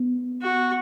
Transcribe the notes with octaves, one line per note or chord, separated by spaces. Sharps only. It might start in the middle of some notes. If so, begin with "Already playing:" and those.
Already playing: B3
F#4